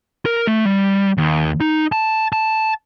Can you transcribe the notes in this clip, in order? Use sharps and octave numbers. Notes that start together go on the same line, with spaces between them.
A#4
A3
G3
D#2
D#4
A5
A5